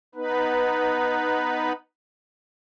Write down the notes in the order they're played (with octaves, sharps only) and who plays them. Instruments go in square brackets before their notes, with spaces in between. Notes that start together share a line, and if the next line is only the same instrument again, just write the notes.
[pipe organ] B3 D#4 B4